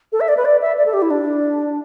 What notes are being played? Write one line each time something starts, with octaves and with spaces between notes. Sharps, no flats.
A4
E5
D5
B4
D5
E5
D5
A4
G4
E4
D4